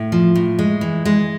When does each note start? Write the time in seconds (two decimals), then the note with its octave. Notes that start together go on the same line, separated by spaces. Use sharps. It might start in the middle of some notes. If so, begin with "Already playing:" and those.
Already playing: A2
0.12 F3
0.35 A2
0.59 G#3
0.81 E3
1.05 G#3